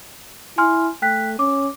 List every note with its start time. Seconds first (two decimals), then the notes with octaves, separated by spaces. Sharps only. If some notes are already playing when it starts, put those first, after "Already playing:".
0.58 E4 G#5 C6 F6
1.02 A3 G5 F#6 B6
1.39 C#4 D6